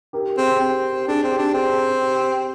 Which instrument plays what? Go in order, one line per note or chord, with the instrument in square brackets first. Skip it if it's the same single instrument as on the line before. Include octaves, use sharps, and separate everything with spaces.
[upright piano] G4 A#4
[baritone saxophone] C4 [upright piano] G#4
[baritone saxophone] C4 [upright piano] G4
[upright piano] G4
[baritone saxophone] D4 [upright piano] G#4
[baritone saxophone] C4
[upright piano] G4
[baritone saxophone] D4
[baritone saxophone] C4 [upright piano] G#4
[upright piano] G4